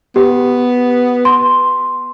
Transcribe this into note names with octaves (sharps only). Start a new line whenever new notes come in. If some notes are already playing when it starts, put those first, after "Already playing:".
B3 G4
C6